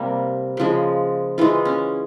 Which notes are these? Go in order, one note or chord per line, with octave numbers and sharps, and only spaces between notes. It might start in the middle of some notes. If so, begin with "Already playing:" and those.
Already playing: C3 G3 A#3
C#3 F3 G#3
E3 G#3 F4
C#4